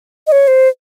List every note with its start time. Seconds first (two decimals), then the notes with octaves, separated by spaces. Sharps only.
0.27 D#5
0.32 C#5
0.47 C5